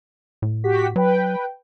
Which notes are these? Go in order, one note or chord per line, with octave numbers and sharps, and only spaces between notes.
A2
F#4 G4 B6
F#3 B4 G5